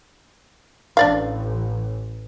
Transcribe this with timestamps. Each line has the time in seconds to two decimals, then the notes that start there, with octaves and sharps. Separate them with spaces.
0.97 A1 D4 D5 F5